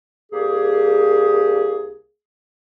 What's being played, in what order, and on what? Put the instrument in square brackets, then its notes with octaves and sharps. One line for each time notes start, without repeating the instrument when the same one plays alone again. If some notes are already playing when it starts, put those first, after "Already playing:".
[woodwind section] C2 A#3 G4 G#4